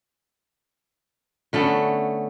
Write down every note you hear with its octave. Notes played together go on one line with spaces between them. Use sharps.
D3 A3 B3 C#4